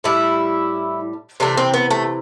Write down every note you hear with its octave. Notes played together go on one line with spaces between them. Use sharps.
A2 G3 E4
C3 E3 A3 D4
C4
B3
A3